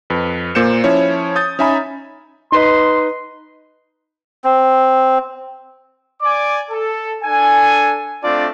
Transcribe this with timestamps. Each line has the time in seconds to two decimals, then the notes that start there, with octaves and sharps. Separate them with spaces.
0.10 F2 B4
0.55 A#2 A#3 C5 G6 C#7 E7
0.84 F3 C#4 E4 C#5
1.36 D#6 G6 A6
1.59 C#4 D#4 E5 G#5 A#5 B5
2.52 D#4 B4 D#5 C6
4.44 C4
6.21 D5 G#5 D6
6.71 A4
7.23 D4 A4 G#5
8.23 A3 C4 D4 F4 D5